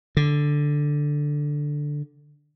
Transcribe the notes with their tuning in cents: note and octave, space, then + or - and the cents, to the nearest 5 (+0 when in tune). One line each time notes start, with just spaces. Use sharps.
D3 +0